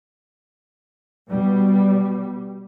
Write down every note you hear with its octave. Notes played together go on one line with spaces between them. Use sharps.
B2 G3